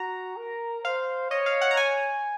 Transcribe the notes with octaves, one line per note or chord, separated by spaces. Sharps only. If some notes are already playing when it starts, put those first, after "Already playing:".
Already playing: F#4 A#5
A#4
C5 F5
C#5 D#5
F5
F#5
A#5
G#5